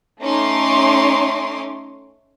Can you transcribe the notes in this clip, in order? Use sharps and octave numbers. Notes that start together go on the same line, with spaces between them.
A3 C#4 D#4 C6 D6